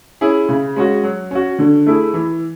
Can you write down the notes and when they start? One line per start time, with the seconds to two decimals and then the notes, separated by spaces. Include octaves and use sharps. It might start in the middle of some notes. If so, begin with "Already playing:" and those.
0.21 C#4 E4 G#4
0.49 C#3
0.76 G#3 C#4 F#4
1.03 F#3
1.31 C#4 F#4
1.59 D3
1.86 A3 E4 G#4
2.14 E3